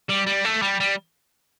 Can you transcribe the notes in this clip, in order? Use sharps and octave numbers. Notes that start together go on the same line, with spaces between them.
G3
G3
A3
G3
G3